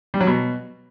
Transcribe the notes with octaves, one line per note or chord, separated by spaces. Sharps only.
G3
F#3
B2